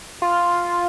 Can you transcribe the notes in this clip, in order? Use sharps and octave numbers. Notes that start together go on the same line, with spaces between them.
F4